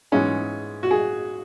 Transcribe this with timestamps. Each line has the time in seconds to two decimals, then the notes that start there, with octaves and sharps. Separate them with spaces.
0.12 G#2 E3 G#3 C#4
0.83 F#4
0.91 G#4